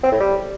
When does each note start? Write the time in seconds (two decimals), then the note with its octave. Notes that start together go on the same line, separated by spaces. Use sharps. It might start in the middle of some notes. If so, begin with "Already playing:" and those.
0.03 C4
0.12 A2
0.20 G3